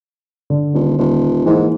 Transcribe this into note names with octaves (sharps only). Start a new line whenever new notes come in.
D3
D#1
D#1
G#2 E3 A#3